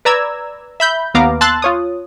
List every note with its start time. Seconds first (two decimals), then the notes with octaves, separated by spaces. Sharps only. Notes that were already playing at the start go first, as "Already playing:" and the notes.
0.05 B4 D5 A#5 E6 G#6
0.80 E5 B5 G6
1.14 D#2 B3 F5 A#5 D6
1.41 A5 C6 E6 F#6 A6
1.62 F4 C#5 D#6